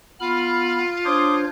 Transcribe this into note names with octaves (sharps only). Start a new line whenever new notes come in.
B3 F4 B5 F6
D4 C5 C#5 C6 D6 D#6